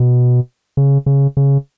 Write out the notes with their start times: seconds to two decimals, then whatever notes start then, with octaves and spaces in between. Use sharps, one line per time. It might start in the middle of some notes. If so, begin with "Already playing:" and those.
Already playing: B2
0.77 C#3
1.06 C#3
1.37 C#3